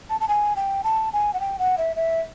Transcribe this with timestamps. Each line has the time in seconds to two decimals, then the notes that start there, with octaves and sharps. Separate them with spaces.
0.10 A5
0.21 A5
0.28 G#5
0.56 G5
0.84 A5
1.13 G#5
1.34 F#5
1.40 G5
1.59 F#5
1.78 E5
1.96 E5